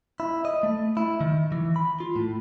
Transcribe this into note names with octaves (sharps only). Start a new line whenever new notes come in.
E4
D#5
A3
E4
D#3
E3
B5
F4
A2